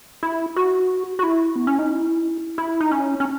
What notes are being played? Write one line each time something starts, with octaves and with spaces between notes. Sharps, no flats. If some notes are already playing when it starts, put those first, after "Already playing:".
E4
F#4
F#4
E4
B3
C#4
D#4
E4
E4
D#4
C#4
C#4